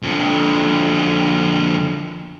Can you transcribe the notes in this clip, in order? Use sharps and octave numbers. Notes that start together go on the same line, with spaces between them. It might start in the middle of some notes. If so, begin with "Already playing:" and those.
F2 D3